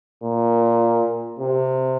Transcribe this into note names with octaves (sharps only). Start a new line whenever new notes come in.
A#2
C3